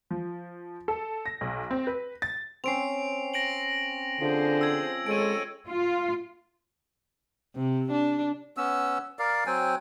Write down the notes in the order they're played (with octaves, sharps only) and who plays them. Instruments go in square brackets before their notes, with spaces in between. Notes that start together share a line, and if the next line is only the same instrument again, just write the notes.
[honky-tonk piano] F3
A4
A#6
B1
C4
B4
A6
[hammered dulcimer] C4 C#4 [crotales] C7 D7 F7
[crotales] A#6 D7 F#7
[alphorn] D3 [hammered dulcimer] F3 [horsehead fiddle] G#4 C5
[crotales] E6 G#6
[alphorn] G#3 [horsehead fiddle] A4 C#5 [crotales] D7 D#7
[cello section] F4
[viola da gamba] C3
D4
[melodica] B3 C#4 E6
A#4 D5 F5
F#3 C4 G5 G#5